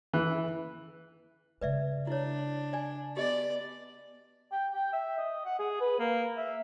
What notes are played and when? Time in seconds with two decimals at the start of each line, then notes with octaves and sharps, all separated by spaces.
0.13 E3
1.61 C#3 G#3 B4 D5 E5
2.07 D4 E4 C#5
2.73 D5 G#5
3.17 B3 G4 D5 D#5
4.52 G5
4.74 G5
4.93 E5
5.18 D#5
5.45 F#5
5.59 G#4
5.81 B4
5.99 A#3
6.37 E5